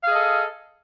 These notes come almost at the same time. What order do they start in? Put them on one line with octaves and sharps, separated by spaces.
F5 G#4 D#5 A4